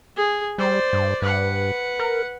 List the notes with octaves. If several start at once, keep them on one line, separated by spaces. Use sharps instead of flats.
G#4
G3 C5 D5
G2
G2 B4 F#5
A#4